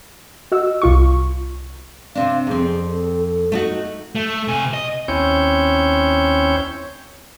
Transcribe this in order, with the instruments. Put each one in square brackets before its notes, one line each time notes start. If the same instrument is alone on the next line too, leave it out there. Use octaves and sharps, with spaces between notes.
[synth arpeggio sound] F#4 D#5 E6
C2 F4 C#6
[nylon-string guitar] C3 C4 D4 [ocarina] F5
[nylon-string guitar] F2 C4 [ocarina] G#4
[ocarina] A4
A4
[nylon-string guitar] A3 D#4 F#4
[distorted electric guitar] A3
C3 G#5
D#5
[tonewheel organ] D#2 C4 C#4 E4 C#5 G6